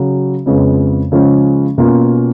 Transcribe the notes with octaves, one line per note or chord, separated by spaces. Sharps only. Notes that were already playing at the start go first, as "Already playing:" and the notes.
Already playing: C#3 F#3 C#4
F2 C#3 G#3 B3
C#3 F3 G#3 C#4
B2 A#3 C#4 F4